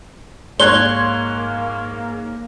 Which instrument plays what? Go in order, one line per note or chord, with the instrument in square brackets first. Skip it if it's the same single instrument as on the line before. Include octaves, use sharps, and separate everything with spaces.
[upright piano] G#2 C#5 [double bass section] A#3 [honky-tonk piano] C6 F#6 G#6 [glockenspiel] G7